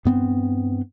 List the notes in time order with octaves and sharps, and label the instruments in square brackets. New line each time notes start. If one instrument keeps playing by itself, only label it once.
[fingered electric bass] G2 B3 C4